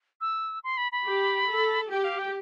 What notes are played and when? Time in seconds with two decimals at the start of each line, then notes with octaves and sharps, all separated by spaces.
0.21 E6
0.64 C6
0.77 B5
0.92 B5
1.05 G4
1.48 A4
1.90 G4 G5
2.04 F5
2.19 G5